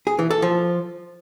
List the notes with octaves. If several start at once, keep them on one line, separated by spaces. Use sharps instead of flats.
G#4
E3
A4
F3